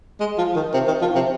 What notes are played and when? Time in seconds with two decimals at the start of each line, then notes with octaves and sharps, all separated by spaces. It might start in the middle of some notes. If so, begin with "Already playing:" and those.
0.20 G#3
0.38 F3
0.56 D#3
0.74 C3
0.87 D#3
1.01 F3
1.15 C3